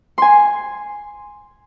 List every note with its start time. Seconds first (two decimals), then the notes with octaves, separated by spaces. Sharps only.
0.18 G#5 C6